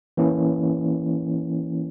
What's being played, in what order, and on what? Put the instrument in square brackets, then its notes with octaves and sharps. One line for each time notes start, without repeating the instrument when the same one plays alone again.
[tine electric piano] E3 A#3 C#4 E4